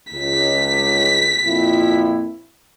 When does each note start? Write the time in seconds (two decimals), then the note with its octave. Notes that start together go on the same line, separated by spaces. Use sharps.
0.13 C#2 B6
1.44 F2 A#2 E4